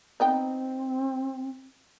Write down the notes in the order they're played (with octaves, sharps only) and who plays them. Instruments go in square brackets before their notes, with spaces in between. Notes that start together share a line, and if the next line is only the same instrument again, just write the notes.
[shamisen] B3 D#4 G5 [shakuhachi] C4